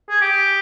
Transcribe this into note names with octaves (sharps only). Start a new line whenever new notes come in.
G#4
G4